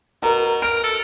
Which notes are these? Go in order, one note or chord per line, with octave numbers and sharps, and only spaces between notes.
B2 A#4 A#5
A#4 D7
A4